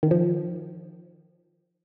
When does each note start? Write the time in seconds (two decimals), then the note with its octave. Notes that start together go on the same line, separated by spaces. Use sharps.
0.03 D#3
0.11 F3